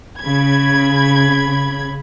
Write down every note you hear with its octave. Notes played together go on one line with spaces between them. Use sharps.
C#3 B5 G#6